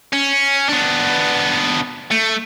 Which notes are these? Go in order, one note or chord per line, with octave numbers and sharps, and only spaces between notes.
C#4
B3 D4
A3